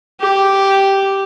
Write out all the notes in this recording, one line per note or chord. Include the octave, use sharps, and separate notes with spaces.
G4